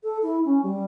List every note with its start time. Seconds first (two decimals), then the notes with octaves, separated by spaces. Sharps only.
0.03 A4
0.22 E4
0.45 C#4
0.63 G3